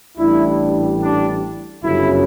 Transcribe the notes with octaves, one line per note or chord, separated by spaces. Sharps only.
A1 A2 G3 D4 E4
D4
G1 F#2 C#3 F#3 E4